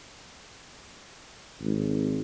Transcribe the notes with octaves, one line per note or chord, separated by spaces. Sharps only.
G#1